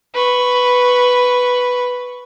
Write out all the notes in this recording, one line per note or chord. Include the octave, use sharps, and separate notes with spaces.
B4 C#6